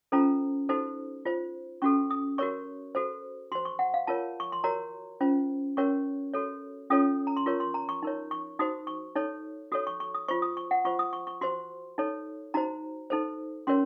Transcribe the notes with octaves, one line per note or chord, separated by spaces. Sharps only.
C#4 F4 A4 C5 A#5
D#4 F#4 A4 C5
F4 C5
C#4 F#4 A4 C#6
D#6
F#4 A#4 C#5 C#6
F#4 A4 C5
F#4 C5 C6
C#6
F#5
F5
F4 A#4 C#5 A5
C#6
C6
F#4 A#4 C#5 A#5
C#4 F4 C5
C#4 F#4 A#4 C#5 C#6
F#4 A4 C#5
C#4 F4 A4 C#5 D#6
A#5
C6
F4 A#4 C#5 C#6
C6
A#5
C#6
D#4 A#4 C#5
C#6
D#4 F#4 C5 D#6
C#6
D#4 A4 C#5
F#4 A4 C#5 D#6
C#6
C#6
D#6
F4 C5 C#6
D#6
C#6
F#5
F4 C5 C#6
D#6
C#6
C#6
F#4 C5 C6
D#4 A4 C#5
D#4 F#4 C5 A#5
D#4 A4 C5
C#4 F#4 A#4 C#5 C6